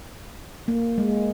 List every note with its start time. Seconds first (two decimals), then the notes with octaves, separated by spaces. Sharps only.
0.68 A#3
0.98 G#3